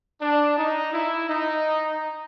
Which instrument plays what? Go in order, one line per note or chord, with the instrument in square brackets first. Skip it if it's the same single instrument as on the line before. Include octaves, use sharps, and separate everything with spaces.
[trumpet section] D4
D#4
E4
D#4